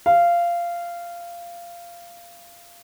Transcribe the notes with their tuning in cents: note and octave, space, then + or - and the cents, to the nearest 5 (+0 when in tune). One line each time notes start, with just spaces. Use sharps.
F5 -15